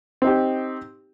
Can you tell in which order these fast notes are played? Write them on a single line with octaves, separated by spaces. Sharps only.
C4 D#4 G4